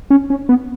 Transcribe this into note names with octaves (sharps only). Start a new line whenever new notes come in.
C#4
C#4
B3